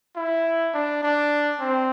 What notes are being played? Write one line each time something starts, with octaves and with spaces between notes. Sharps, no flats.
E4
D4
D4
C4